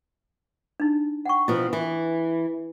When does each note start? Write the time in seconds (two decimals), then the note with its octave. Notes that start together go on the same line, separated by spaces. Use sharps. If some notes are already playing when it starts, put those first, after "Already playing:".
0.80 D4 D#4
1.26 F#5 G5 C#6
1.48 B2 F3 E4
1.73 E3